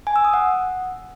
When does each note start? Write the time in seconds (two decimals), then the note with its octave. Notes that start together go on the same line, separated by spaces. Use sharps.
0.07 G#5
0.16 E6
0.25 D#6
0.33 F#5